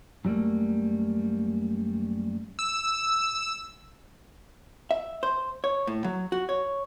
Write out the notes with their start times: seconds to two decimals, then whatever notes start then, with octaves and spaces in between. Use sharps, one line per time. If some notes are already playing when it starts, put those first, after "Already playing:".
0.25 F#2 F#3 G3 A3 A#3
2.59 E6
4.91 E5
5.23 C5
5.64 C#5
5.87 A2
6.04 F#3
6.32 F#4
6.49 C#5